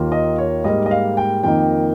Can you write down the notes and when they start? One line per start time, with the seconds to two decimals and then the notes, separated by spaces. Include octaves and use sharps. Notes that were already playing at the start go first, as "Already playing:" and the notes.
Already playing: D#2 D#3 A#3 F4
0.12 D#5
0.38 C#5
0.64 G#2 G3 A#3 D#5
0.86 D#5
0.91 F5
1.17 G5
1.43 F2 D#3 A#3 D#4 G5